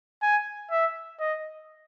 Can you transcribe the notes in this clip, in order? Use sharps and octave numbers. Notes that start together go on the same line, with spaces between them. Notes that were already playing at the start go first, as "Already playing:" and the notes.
G#5
E5
D#5